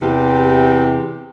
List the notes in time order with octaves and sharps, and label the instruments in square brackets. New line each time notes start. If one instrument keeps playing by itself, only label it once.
[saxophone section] E2 C3 G4